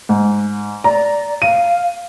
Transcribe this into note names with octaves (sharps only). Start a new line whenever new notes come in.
G#2
D5 A#5
F5 D#7